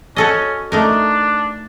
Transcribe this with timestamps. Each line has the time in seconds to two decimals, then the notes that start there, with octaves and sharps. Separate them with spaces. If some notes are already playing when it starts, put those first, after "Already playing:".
0.16 C#4 F#4 A4 D#5
0.72 A3 D4 D#4 A#4